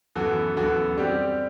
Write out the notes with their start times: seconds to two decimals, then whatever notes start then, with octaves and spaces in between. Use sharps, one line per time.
0.15 F#2 E3 B3 F#4 A4
0.57 F#2 E3 B3 F#4 A4
0.97 G3 C4 G4